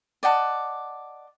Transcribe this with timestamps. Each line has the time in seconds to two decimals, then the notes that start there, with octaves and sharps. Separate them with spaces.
0.23 D5 D#5 F#5 A5